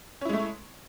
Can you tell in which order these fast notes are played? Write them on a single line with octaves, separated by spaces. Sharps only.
C#4 E4 G#3 A3